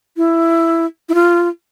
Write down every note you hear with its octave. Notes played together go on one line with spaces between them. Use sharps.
E4
E4
F4